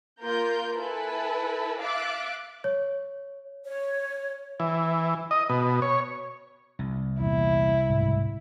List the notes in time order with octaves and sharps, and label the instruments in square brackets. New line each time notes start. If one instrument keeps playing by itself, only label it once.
[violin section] A#3 F4 A#4 G6
E4 A4 B4 G#5 A5
E5 F5 D6 F#6 A6
[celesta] C#5
[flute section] C#5
[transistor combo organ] E3
D#5
B2
C#5
[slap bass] C2
[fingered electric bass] E2 A#2 [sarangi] E4
[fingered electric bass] E1 D2 G#2